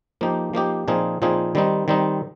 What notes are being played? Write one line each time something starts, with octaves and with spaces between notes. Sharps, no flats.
F3 A#3 D#4 G4
F3 A#3 D#4 G4
A#2 F3 C4 D#4 G#4
A#2 F3 C4 D#4 G#4
D#3 G3 C4 D#4
D#3 G3 C4 D#4